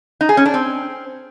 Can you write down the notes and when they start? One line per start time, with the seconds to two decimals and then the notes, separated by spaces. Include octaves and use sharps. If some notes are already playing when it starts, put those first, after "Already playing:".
0.21 D#4
0.29 G#4
0.37 C#4
0.46 D4
0.54 C4